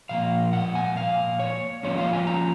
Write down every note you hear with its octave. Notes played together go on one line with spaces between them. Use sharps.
A#2 F3 A#3 F5
F#5
G#5
F5
C#5
F3 A#3 C#4 F4 C#5
F5
G#5
A#5